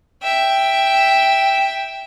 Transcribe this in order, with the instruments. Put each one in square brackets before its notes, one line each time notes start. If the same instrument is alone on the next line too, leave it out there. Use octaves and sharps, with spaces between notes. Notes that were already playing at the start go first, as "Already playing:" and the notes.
[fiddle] E5 G5